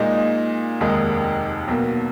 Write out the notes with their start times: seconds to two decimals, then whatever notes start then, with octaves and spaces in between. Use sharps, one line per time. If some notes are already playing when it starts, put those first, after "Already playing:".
Already playing: A#2 G#3 D#4
0.80 F1 D#2 D#3 G#3 D#4
1.68 B1 B2 A#3